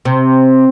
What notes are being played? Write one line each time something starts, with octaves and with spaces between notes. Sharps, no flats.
C3